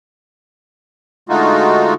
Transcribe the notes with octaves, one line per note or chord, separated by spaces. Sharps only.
D3 G#3 A3 D#4 F4 F#4